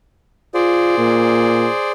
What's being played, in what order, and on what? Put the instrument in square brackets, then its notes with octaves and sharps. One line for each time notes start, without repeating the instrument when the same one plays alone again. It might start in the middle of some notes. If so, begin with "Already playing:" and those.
[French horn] F4 [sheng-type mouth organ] G#4 C5 D5
[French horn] A#2